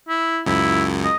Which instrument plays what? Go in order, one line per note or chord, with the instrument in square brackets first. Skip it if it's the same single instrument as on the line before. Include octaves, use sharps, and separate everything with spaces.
[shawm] E4
[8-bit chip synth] C#2 F#2 [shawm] E4
[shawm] D#5